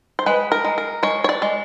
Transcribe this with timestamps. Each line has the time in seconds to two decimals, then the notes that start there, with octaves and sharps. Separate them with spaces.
0.19 C5
0.26 G#3 B4
0.52 A#4
0.64 G#3
0.78 A#4
1.03 G#3 C#5
1.24 C#5
1.29 D5
1.42 G#3